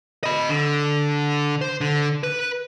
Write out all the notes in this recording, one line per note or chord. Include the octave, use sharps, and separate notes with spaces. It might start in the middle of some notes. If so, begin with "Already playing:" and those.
D#5 B5
D3
C5
D3
B4